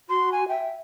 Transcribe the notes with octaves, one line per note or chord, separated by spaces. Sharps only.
F#4 C6
G#5
E5 G5